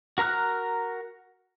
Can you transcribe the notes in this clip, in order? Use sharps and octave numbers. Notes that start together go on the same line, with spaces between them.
F#4 A#4 A#5 F6 F#6